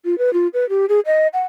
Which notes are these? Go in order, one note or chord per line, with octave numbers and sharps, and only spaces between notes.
F4
B4
F4
B4
G4
G#4
D#5
F#5